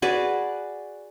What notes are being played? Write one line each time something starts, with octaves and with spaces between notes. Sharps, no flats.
F#4 G#4 B4 D5